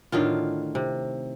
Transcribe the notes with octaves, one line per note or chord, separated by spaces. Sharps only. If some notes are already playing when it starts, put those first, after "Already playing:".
A2 D3 D#3 F4
C3